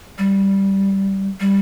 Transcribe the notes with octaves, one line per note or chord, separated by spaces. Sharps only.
G3
G3